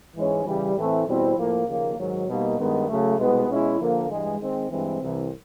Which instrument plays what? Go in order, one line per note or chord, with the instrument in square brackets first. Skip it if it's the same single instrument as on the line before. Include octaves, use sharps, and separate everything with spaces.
[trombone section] G#2 E3 G#3 C#4
C#3 E3 G3
A2 E3 A3 C4
E2 B2 G3 C4 E4
A2 F3 A#3
D#2 C#3 F3 A#3
G#2 D#3 F#3
B2 G3 A#3 D#4
G2 D#3 G#3 B3
C#3 F#3 A3
C2 B2 G#3 B3
B2 G#3 C#4 E4
D3 F3 A#3
G2 E3 G#3
D#3 G#3 C4
G2 E3 G#3 C4
C2 C3 E3